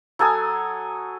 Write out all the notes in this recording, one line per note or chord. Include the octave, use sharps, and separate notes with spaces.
F#3 A4 G#5 D#6